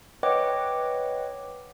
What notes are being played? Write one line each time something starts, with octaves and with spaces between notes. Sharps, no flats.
B4 C#5 D#5 F#5 G5 D6